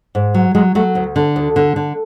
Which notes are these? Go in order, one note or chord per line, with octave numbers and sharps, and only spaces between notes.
G#2
F#3
F#3 G#3
F#3 A3
D2
D3
D2
D3
D3